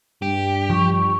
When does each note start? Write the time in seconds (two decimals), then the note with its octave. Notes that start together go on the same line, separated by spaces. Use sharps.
0.22 G2 G4
0.70 F3 C#6